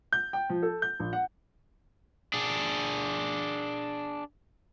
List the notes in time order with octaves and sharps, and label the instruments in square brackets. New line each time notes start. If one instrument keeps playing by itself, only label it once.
[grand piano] G6
G5
F3
A4
G6
A#1
F#5
[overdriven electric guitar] D4 G#4